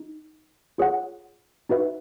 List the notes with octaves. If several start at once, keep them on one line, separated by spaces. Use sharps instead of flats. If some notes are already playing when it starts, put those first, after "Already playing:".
Already playing: D#4
F4 G#4 C#5 F#5
D#4 F#4 B4 E5